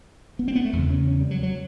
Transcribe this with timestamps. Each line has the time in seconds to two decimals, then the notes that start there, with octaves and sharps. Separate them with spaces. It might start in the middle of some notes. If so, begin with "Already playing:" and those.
0.39 B3
0.48 C4
0.55 B3
0.65 A3
0.73 E2 C#3
0.90 C#4
1.07 C#4
1.20 G3
1.31 F#3
1.43 F#3